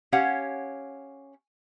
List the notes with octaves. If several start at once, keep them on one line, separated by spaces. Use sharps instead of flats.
C#4 G4 C#5 F5 F#5